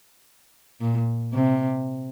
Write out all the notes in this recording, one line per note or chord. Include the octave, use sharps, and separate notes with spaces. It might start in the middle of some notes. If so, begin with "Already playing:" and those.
A#2
C3